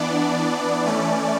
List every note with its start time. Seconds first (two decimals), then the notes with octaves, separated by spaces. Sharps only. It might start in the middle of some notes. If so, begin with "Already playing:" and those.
Already playing: E3 B3 D4 D5
0.85 E3 A3 C#4